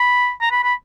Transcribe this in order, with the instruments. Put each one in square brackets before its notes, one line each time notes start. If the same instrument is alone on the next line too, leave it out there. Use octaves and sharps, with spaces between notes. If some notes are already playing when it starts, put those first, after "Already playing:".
Already playing: [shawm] B5
A#5
B5
B5